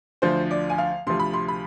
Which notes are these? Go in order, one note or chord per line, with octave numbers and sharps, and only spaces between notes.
D2 D3 F3 C5
D5
G#5
F5
D2 C3 F3 C6
B5
C6
B5